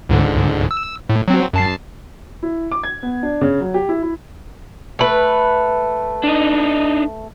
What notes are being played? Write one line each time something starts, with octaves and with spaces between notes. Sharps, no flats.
C#2 G#2 D3
E6
A2
F#3 C4
F#2 A5 C7
E4
D6
G#6
B3
D4
C#3
F#3
G4
E4
E4
A3 B4
D4 D#4